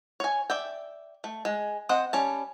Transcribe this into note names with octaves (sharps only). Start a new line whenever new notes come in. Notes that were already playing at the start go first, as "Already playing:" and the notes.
C#5 G#5
D5 E5 G5
A3
G#3
C4 C5 D#5 F#5
G3 C#4 A5